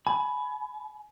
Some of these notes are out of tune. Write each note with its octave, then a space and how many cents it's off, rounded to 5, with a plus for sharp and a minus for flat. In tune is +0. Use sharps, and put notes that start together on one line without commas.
G#5 +30 B5 +0